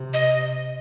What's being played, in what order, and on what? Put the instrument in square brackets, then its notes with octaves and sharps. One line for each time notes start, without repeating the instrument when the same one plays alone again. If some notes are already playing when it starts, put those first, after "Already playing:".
Already playing: [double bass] C3
[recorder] D#5